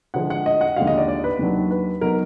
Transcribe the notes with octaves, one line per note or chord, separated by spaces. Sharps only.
D3 F3 G#3 F#5
F#5
D#5
F#5
D#2 D3 F3 G#3 F5
D#5
D5
D5
B4
D#2 D#3 F#3 D4
B4
F#3 B3 D#4 A#4